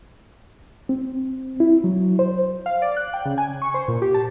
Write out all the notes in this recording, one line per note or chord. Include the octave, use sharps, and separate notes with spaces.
C4
E4
F#3
C5
F5
D5
F#6
G5
C#3
G#5
C#6
C5
A#2
G4
A5